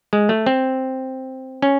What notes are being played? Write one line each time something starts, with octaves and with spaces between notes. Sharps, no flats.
G#3
A3
C4
C#4